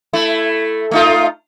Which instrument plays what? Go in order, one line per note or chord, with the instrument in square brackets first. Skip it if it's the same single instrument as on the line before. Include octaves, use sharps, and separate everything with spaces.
[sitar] A3 E4
A3 D#4 F4